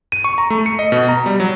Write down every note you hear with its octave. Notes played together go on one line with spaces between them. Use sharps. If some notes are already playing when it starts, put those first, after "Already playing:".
D#7
C#6
A#5
A3
C#7
D#5
B2
A#5
G3
F#3